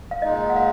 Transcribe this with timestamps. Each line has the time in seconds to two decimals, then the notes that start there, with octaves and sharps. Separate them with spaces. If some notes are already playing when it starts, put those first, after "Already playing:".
0.11 F5
0.22 A#2 G#3 D#4 D#5
0.49 F#5
0.56 F5